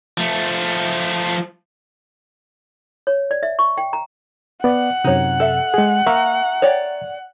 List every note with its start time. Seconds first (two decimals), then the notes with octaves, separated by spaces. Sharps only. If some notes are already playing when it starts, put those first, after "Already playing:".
0.18 F3 A3
3.07 C#5
3.31 D5
3.43 E5
3.59 C#6
3.77 G5
3.93 A#5
4.64 B3 D5 F#5
5.04 F#2 C3 D#4 C#5
5.40 A4 E5
5.74 G#3 G#4
6.06 A#3 E5 A#5 C#6
6.62 C#5 D5 G5